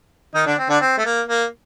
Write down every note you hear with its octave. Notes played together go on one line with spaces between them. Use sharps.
D#3 D#4
D3 D4
C4
D3 D4
C4
A3
A#3
A#3